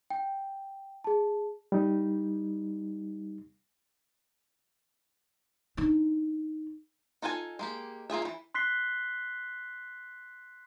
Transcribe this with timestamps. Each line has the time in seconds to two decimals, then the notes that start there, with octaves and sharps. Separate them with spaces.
0.10 G5
1.04 G#4 A5
1.72 G3 D#4
5.77 D4 D#4
7.22 D#4 F4 A4 A#4 G#5
7.59 G#3 A#3 G4
8.10 A#3 F4 G#4 E5
8.22 D#3 E3
8.55 C6 F#6 B6 C7 G7